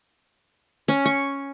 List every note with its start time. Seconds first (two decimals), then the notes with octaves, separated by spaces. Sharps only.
0.88 C#4
1.06 C#6